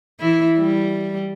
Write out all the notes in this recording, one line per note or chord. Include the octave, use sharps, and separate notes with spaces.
E3 E4
G3